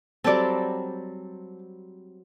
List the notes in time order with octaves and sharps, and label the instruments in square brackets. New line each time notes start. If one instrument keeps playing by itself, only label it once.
[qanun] F#3 G3 C4 [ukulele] A4 D5